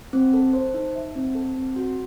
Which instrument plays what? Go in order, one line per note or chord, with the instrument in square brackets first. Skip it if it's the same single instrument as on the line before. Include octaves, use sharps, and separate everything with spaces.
[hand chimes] C4
A4
C5
D#4
E5
C4
A4
C4
F#4